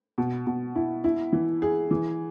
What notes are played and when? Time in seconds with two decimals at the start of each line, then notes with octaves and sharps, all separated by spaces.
0.18 B2
0.47 B2
0.75 E4
1.04 E4
1.32 E3
1.62 G#4
1.91 E3